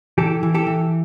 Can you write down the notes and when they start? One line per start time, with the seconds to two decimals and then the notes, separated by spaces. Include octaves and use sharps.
0.18 E3 G4 A4
0.43 E3
0.54 G4 A4
0.67 E3